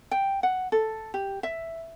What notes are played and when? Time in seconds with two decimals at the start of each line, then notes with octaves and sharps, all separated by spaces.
0.11 G5
0.43 F#5
0.72 A4
1.14 G4
1.43 E5